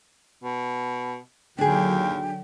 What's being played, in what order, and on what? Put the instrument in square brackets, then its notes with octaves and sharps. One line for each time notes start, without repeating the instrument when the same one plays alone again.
[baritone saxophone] B2
[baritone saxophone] D#2 [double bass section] D3 F#3 [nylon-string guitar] D4 G#4 [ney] G5